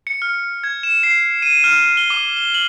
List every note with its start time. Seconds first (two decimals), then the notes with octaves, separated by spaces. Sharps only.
0.07 C#7
0.22 F6
0.64 G#6
0.83 E7
1.03 C7
1.42 D#7
1.64 F6
1.97 G7
2.10 D6
2.37 G7
2.54 F#7